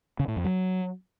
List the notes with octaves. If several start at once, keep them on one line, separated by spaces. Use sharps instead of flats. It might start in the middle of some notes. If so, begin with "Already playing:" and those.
C#3
A2
F2
F#3